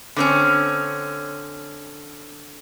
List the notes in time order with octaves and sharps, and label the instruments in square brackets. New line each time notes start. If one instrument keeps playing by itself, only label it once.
[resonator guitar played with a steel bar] D3 C4 C#4